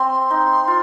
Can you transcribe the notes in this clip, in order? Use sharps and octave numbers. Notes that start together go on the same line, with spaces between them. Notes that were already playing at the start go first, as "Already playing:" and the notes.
Already playing: C4 C6
D#4
F4